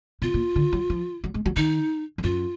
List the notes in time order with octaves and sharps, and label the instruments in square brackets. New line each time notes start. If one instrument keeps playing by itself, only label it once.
[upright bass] B2 [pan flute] F4
[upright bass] A#2
D3
F#3
F3
F#3
G#3
F#3
[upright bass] D#3 [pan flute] D#4
[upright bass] F2
[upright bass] F#2 [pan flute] F4